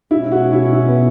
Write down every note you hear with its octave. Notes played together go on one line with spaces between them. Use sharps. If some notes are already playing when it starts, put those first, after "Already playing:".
B2 G#3 C#4 E4
F#4
E4
E4
B3